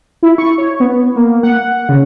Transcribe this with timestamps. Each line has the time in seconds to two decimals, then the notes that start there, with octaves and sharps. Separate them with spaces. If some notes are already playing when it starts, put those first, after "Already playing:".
0.23 E4
0.38 C#6
0.58 C#5
0.80 B3
1.16 A#3
1.43 F#5
1.89 C#3